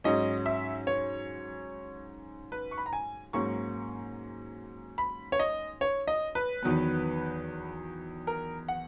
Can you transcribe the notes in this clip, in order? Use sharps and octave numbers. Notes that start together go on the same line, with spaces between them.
G#2 F#3 C#4 D#5
E5
C#5
B4
C#6
B5
A#5
G#5
G#2 F#3 A#3 C#4 C#6
B5
C#5
D#5
C#5
D#5
B4
E2 D#3 F#3 B3
A#4
F#5